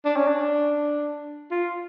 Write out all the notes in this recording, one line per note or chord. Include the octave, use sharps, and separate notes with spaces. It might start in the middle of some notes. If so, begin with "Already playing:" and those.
D4
C#4
D4
F4